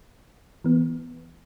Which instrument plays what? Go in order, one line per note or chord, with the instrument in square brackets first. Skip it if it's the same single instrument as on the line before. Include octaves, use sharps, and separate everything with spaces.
[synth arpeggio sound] E3 B3